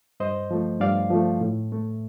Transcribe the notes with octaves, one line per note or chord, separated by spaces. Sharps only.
G2 C5 D#5
F3 A3
G2 D5 F5
F3 A3
A2
A3